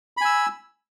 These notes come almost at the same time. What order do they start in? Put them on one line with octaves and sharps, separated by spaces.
B5 G#5 E6